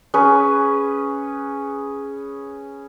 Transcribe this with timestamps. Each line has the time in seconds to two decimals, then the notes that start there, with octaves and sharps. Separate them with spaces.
0.14 C#4 G#4 B4